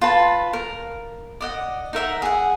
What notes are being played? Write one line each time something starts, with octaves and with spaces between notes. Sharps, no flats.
F4 B4 A5
A#4
D5 D#5 F#5
D#4 A#4 E5 F#5
G#4 F#5